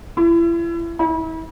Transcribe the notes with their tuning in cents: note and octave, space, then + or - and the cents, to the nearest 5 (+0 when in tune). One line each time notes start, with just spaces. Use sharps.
E4 +35
E4 -35